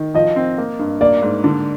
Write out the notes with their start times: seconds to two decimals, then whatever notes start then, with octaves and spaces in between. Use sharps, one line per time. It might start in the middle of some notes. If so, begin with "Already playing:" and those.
Already playing: D#3
0.14 F3 D#5
0.36 C4
0.58 A#3
0.79 G2
1.01 A#3 D5
1.22 G#2
1.44 D3